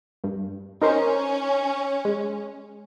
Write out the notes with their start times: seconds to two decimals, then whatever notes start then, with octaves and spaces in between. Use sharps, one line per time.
0.24 G2
0.82 C#4 D#4 A#4 C5
2.05 G#3